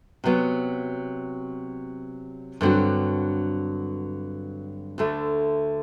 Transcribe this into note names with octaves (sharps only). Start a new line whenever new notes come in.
C3 F#3 B3
G2 D3 F#3 C4 F#4
D2 D3 A3